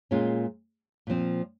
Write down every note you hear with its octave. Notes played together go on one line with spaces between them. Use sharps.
A#2 G#3 C#4 F4
A#2 F3 C4